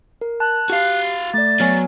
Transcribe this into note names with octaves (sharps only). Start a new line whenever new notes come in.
A#4
A5 F#6
F#4 G4 F5
A3 D5 A6
F#3 B3 C#5 G#5